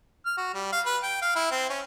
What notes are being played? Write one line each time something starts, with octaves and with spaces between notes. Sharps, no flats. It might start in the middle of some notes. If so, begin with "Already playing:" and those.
F6
F#4
G3
F5
B4
G5
F5
E4
C4
C#4